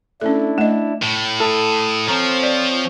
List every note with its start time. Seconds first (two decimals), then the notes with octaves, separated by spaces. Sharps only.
0.21 A3 C#4 D4 E4 A4
0.58 A3 D#5 E7
1.02 A2
1.40 A4 D#6
2.08 F3 C4 C#5 A#5
2.43 D5